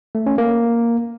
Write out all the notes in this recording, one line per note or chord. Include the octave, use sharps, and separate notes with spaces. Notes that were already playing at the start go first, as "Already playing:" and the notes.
A3
C#4
A#3